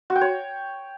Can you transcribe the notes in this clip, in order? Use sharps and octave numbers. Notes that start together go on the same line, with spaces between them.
F#4
G5
C#5